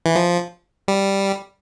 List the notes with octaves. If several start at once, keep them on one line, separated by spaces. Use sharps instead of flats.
E3
F3
G3